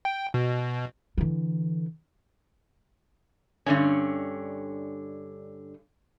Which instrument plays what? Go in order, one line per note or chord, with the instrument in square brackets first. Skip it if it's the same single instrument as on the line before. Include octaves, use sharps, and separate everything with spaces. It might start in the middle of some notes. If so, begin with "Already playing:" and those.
[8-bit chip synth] G5
B2
[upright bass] D3 E3
[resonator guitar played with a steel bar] G2 D3 C#4